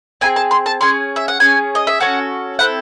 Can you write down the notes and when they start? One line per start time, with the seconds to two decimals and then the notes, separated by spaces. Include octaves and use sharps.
0.21 C4 E4 G#4 G#5
0.36 A5
0.51 C6
0.66 A5
0.81 C#4 G#4 C6
1.16 E5
1.28 F#5
1.40 C#4 G#4 G#5
1.75 D#5
1.87 E5
2.00 C#4 F#4 A4 F#5
2.59 C4 E4 A4 F#5